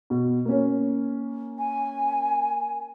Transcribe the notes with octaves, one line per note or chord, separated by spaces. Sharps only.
B2
A#3 C#4
G#5